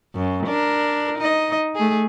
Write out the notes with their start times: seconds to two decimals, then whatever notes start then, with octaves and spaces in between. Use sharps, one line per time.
0.15 F#2
0.46 D4 A#4
1.18 D#4 D#5
1.75 A3 G#4